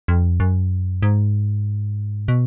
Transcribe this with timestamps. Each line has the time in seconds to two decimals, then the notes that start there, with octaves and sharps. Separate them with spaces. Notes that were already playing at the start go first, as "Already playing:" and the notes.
0.08 F2
0.40 F#2
1.03 G#2
2.28 B2